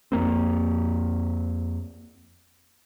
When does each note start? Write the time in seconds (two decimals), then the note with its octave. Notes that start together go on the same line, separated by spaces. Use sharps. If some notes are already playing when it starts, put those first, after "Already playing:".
0.12 F2 A#3 C4